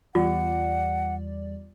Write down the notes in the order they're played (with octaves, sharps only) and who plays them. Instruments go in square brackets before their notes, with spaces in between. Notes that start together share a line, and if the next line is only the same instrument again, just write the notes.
[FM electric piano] E2 G3 D5 [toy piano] F4 [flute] F#5